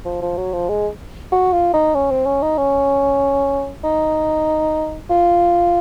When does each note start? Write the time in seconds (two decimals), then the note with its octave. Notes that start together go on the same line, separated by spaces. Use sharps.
0.05 F3
0.22 F3
0.37 F#3
0.53 F3
0.69 G#3
1.32 F#4
1.53 F4
1.74 D#4
1.95 C#4
2.11 C4
2.26 C#4
2.42 D#4
2.58 C#4
3.84 D#4
5.10 F4